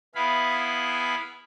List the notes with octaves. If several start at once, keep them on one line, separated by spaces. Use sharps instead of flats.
B3 E4 G#4 F5 B5